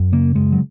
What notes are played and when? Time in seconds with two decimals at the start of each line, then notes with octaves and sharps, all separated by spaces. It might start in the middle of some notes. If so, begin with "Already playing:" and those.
Already playing: F#2
0.12 C#3 A#3
0.35 F#2 G#3
0.52 F#3